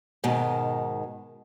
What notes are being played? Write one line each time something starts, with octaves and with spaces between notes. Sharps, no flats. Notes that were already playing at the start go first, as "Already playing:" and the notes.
G#2 B2 D#3 G#3